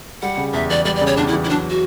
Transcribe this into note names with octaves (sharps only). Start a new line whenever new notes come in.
G3 F#5
C#3
E2 E5
E3 D5
G3 D5
D5
C#3
C#5
E2 D4
E4
E3
E4
F#3 D4
F#4